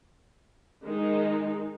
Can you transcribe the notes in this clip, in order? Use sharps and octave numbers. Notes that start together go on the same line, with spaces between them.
D#3 G#3 D#4